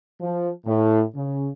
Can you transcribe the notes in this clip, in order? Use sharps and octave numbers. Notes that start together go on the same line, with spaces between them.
F3
A2
C#3